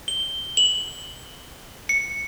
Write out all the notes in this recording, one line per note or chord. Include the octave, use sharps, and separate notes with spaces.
G7
F#7
C#7